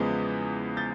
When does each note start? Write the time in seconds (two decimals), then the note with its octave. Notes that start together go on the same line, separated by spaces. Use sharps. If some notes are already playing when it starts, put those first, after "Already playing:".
Already playing: E2 C#3 F3 G#3 B3
0.77 G6 A6